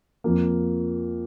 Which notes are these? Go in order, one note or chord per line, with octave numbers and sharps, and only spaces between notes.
F2 F3 A#3